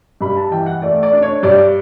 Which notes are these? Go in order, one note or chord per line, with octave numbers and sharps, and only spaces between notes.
G2 B5
A5
E3 G5
F#5
A3 D5
D5
D4
C#5
G2 D5